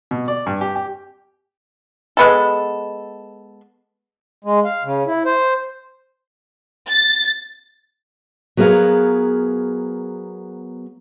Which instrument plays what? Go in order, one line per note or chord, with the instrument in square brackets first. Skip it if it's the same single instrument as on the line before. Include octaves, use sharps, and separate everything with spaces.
[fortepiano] B2
D5
G2
G4
G4
[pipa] G#3 B3 A4
[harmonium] G#3
F5
C#3
E4
C5
[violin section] A6
[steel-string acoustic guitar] F#3 B3 G#4 A#4 F5